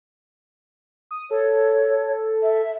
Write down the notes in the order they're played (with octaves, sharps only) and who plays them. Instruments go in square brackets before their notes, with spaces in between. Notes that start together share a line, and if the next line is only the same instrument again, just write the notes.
[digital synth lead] D#6
[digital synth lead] A4 [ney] C#5
[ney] E5